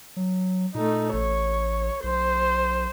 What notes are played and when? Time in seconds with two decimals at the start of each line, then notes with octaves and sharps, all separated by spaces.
0.17 F#3
0.75 A#2 A3 D#4
1.13 A1 C#5
2.04 B1 C5